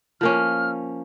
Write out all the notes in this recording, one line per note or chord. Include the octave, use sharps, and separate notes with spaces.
F3 A#3 C#4 F6